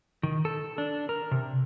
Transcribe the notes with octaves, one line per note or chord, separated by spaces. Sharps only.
D#3
A4
D4
A#4
C3